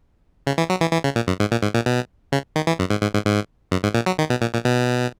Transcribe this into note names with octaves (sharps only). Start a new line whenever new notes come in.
C#3
E3
F#3
E3
E3
C#3
A#2
F#2
G#2
A#2
G#2
A#2
B2
C#3
D#3
E3
F#2
G#2
G#2
G#2
G#2
F#2
G#2
A#2
F#3
D#3
B2
A#2
A#2
B2